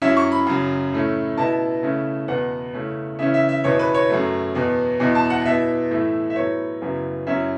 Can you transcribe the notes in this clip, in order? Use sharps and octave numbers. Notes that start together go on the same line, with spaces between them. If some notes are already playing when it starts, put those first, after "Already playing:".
F#2 F#3 C#4 E4 E5
C#6
B5
F#2 C#3 F#3
A2 A3 C#4
B2 B3 E4 A5
C#3 A3 C#4 E4
E2 B2 B3 F#5
C#3 A3 C#4 E4
C#3 E3 C#4 E5
E5
E5
E2 B2 B3 E4 C#5
B4
C#5
F#2 F#3 A3
E2 B2 B3
E2 B2 B3 E4
A5
F#5
B2 B3 E4 E5
A2 E3 A3 E4
E5
A2 F#3 B3 C#5
F#2 C#3 F#3 B3 E4
F#2 F#3 C#4 E4 E5